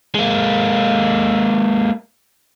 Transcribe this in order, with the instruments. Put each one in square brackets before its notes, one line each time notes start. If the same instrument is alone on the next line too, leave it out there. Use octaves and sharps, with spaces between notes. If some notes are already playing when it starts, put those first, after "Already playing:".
[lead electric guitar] G#3 A#3